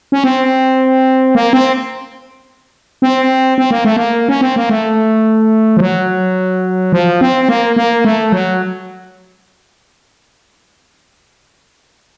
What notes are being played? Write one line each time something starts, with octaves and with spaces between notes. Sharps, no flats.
C#4
C4
A#3
C4
C4
C4
A#3
A3
A#3
C#4
C4
A#3
A3
F3
F#3
F3
C4
A#3
A#3
A3
F#3